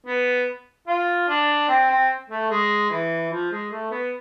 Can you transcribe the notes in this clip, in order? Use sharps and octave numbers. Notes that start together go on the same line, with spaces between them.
B3
F4
D4
C4
C4
A3
G#3
E3
F3
G#3
A3
B3